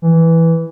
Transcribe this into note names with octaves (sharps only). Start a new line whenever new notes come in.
E3